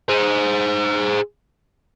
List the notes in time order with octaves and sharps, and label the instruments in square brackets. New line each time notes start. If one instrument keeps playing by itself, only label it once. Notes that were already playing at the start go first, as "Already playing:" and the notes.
[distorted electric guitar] G#4 C5